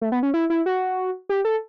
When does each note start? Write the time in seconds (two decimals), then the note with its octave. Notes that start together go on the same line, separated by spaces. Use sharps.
0.01 A3
0.12 B3
0.23 C#4
0.34 E4
0.50 E4
0.66 F#4
1.29 G4
1.45 A4